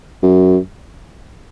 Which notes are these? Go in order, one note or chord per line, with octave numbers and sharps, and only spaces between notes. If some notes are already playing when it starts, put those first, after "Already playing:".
F#2